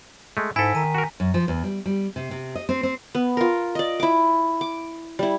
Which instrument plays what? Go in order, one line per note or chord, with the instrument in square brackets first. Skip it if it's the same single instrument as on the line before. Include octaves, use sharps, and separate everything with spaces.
[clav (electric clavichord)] G#3 A3
[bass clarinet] G#2 [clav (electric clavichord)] E4 A4 [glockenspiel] G#5 B6
[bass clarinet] D#3 [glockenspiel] A#5 D#7
[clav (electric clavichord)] F#4 A#4
[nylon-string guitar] F#2
F3
E2
G3
G3
C3
C3
D#5
C4
C4
[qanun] B3
F4 A#4
D5 D#5
E4 D6
D6
G3 E4